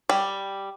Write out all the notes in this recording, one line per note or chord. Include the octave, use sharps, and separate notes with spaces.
G3